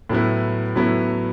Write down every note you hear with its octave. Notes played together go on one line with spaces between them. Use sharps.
A2 F#3 B3 E4
A2 F#3 B3 E4